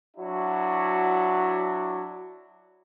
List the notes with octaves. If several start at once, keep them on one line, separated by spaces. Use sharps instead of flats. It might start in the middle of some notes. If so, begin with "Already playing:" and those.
F#3 D4 E4 F#4